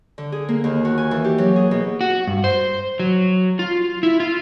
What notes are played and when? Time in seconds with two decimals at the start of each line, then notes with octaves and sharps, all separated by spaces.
0.18 D3
0.32 G#4
0.49 A#3
0.64 D#2
0.85 F#4
0.98 G#5
1.11 E3
1.24 G4
1.38 F#3
1.56 G#4
1.71 B2
2.01 F#4
2.27 G2
2.44 C5
3.00 F#3
3.59 F4
4.03 E4
4.20 F4